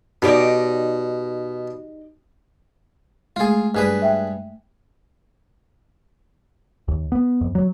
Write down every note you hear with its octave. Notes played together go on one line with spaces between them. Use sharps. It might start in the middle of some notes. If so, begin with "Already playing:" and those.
B2 D#4 G4 D5
G#3 A3 F4 G#4
G2 G#4 B4
E5 G5
D#2
B3
F2
F#3